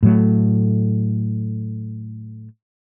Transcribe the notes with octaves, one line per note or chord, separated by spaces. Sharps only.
A2 F#3 A3